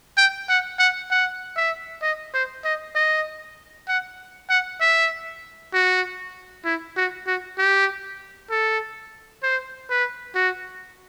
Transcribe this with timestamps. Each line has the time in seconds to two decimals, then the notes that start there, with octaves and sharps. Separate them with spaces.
0.17 G5
0.49 F#5
0.79 F#5
1.11 F#5
1.56 E5
2.02 D#5
2.34 C5
2.65 D#5
2.95 D#5
3.88 F#5
4.49 F#5
4.81 E5
5.74 F#4
6.65 E4
6.97 F#4
7.27 F#4
7.58 G4
8.50 A4
9.43 C5
9.90 B4
10.35 F#4